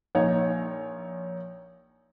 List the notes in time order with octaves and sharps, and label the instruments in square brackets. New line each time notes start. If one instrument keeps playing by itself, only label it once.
[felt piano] A#1 A#3 D#4 C#5 A#5